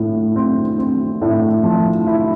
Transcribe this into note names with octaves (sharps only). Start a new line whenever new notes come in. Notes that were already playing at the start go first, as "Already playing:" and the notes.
Already playing: A2
C4
C4
A2
F3
E4